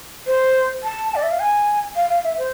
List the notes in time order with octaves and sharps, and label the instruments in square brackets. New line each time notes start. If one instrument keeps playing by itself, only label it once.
[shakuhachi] C5
A5
D5
E5
F5
G#5
F5
F5
E5
C5